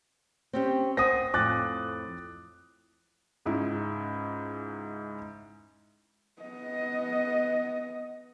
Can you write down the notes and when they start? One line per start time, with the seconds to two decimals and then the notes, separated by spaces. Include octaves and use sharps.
0.53 C4 C#4 G4
0.97 C5 E5 F#5 D#6 A#6
1.34 F2 A2 D6 F#6 A6
3.45 C#2 G#2 E4
6.42 B3 D#5